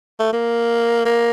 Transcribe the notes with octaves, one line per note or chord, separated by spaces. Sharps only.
A3
A#3
A#3